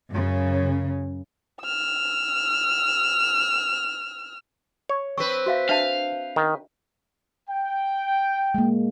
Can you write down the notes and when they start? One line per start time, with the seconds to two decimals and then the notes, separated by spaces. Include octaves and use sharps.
0.12 F#2 C#3
1.62 E6 F6
4.89 C#5
5.18 C4 B4 C#6
5.46 F#4 E5 F5
5.69 D4 E5 F5 A5
6.36 D#3
7.49 G5
8.54 G#3 A#3